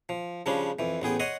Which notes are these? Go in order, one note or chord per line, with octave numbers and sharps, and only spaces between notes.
F3
C#3 F3 G3 C#4 D4
F2 E3
A1 B3 G#4 G5
C#5 D#5 F#5 C6 D#6